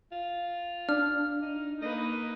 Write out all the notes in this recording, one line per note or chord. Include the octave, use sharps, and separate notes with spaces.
F4
D4 F6
D#4
A#3 D#4 B4 D#5